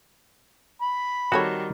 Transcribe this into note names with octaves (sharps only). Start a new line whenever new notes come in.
B5
D#3 G3 C4 F#4 A4 C#5